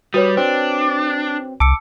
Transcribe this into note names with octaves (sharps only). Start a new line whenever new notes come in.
G3 F#4 B4 C#5 D#6
C4 D4
C2 A5 D6 E6 C#7